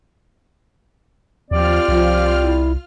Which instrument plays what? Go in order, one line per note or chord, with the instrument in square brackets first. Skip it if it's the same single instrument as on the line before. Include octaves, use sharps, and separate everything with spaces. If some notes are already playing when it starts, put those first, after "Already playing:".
[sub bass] D#2 [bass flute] F3 [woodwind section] C4 G4 D5 [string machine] F4 F6
[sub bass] C2 [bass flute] F3
[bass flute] E4